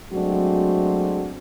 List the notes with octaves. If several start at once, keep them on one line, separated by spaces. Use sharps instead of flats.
F#3 G#3 A3 C4 D4 F#4